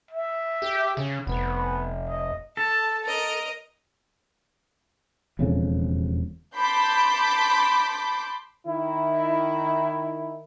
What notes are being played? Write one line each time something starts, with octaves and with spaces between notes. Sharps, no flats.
E5
G4
C#3
F1 B3
D#5
A4 A5
A#4 D#5
E1 F2 C#3
A5 B5 C6 D6 G6 B6
D#3 E4